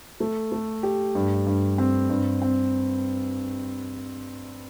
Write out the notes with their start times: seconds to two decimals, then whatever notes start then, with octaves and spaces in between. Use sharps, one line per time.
0.20 A3
0.52 A3
0.83 G4
1.15 G2
1.47 G2
1.78 C4
2.09 G2
2.42 C4